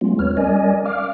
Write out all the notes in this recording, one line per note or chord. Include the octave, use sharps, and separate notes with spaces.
F#3 G#3 A3 B3 C#4 F4
D#2 C4 B4 C#5 F6
G3 C#4 A#4 D5 D#5 G#5
F5 D6 F6